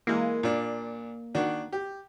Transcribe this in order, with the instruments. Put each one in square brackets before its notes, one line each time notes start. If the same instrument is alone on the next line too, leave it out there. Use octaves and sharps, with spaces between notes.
[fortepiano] E3 G#3 [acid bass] A#3
[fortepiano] A#2 D4
D#3 D4 F#4
G4